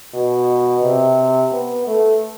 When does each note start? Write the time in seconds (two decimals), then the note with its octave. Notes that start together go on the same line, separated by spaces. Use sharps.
0.14 B2
0.83 C3
1.52 B3
1.87 A3